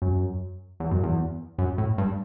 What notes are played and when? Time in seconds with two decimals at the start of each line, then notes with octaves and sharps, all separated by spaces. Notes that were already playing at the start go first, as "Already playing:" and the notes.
0.02 F#2
0.80 E2
0.91 F#2
1.03 E2
1.58 F#2
1.78 A2
1.98 G2